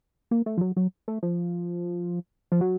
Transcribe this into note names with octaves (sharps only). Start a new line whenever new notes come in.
A#3
A3
F3
F#3
F#3
A3
F3
F3
F#3